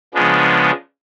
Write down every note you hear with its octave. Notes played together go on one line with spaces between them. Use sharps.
C#3 F3 G#3 B3 D4